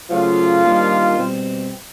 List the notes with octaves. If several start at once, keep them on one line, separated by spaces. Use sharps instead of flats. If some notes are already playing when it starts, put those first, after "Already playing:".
C#3 F3 F#3 A3 F4
D#3 G3 A#3 D4
B2 G3 C4